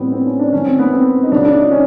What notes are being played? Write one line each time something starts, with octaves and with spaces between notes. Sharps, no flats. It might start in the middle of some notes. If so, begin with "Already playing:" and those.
Already playing: A1 A2 E3 G3 B3 C4
C4
C#4
D4
G#1 F#2 D#3 C#4
C4
B3
C4
D#4
C#2 C#3 F#3 D4
D4
D#4
C#4